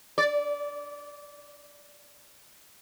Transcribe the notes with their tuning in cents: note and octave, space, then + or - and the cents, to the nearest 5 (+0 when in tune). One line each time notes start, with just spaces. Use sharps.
D5 -20